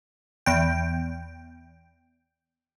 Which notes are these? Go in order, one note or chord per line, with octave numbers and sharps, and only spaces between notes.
E2 G5